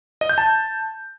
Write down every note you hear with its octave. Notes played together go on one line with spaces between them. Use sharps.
D#5
G6
A5